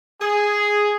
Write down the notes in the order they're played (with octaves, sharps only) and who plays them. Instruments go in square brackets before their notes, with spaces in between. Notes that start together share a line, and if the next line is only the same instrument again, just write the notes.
[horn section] G#4